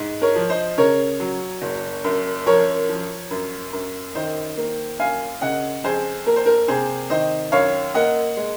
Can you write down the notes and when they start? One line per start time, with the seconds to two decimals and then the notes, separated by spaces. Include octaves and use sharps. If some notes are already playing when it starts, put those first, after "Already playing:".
Already playing: G#2
0.22 A#4 C#5
0.35 F3
0.49 C5 D#5
0.77 C#3 A#4 C#5
1.20 F#3
1.62 F#1
2.04 F#2
2.46 F3 A#4 C#5
2.89 F3
3.31 F#2
3.73 F#2
4.15 D#3 C5 D#5
4.57 A#3
4.99 F#2 F5 G#5
5.41 C#3 D#5 F#5
5.84 F2 G#4 C5
6.26 A#3 A#4
6.36 C5
6.46 A#4
6.68 C3 G#4 C5
7.10 D#3 C5 D#5
7.52 F#2 C#5 F5
7.94 A#3 D#5 F#5
8.37 G#3